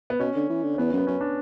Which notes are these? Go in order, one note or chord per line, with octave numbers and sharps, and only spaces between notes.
B3
B2 C#4
D3
E3
D3
C#4
E2 B3
F#2 C#4
B3
F#2 C#4
D4